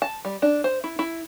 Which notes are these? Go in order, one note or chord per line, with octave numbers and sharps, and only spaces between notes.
A5
G3
D4
C5
E4
E4